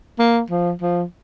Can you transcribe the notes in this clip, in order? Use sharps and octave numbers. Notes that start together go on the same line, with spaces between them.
A#3
F3
F3